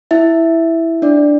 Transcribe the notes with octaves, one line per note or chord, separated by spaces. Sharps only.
E4 E5
D4 D5